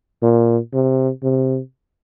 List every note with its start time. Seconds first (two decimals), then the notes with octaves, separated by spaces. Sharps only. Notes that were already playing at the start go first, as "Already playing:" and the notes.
0.23 A#2
0.74 C3
1.23 C3